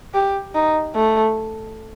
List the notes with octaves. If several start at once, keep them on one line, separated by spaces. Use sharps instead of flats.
G4
D#4
A3